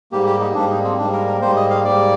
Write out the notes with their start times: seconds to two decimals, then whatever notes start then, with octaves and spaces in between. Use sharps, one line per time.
0.12 G#2 G3 A#3 G4
0.26 G4
0.40 D#4
0.55 G#2 G3 A#3 D4
0.70 D#4
0.84 C4
0.98 G#2 G3 A#3 D4
1.13 A#4
1.27 A#4
1.41 G#2 G3 A#3 C5
1.56 D#5
1.70 F5
1.84 G#2 G3 A#3 D5